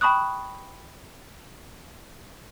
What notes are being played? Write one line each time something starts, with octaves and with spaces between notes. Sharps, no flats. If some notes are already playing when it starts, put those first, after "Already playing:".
G5 A5 B5 C#6 D#6 F#6